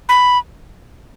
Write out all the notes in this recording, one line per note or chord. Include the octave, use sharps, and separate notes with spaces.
B5